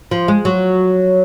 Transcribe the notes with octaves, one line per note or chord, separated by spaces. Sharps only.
F3
G#3
F#3